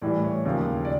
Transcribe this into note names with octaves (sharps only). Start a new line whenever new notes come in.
A2 E3 G3 D5
C#5
D#2 C#3 F3 A#3
D5